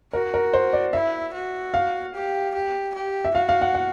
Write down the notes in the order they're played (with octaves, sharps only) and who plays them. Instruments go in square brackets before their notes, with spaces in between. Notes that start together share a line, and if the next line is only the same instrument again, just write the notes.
[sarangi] F#4 [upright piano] A#4
[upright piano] A#4
C5
D5
[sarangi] E4 [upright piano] E5
[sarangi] F#4
[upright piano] F5
[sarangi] G4
G4
G4
[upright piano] E5
[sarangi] F#4 [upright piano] F5
[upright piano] F5
F#5
F#5